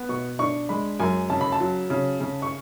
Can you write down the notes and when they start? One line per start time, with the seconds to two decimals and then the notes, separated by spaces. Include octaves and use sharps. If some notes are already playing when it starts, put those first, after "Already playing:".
Already playing: B3
0.09 B2 C#6
0.39 D4 C#6
0.69 G#3 B5
1.00 F#2 G#5
1.30 C#3 A5
1.41 B5
1.52 A5
1.60 F#3
1.90 C#3
2.20 C#3
2.42 C#6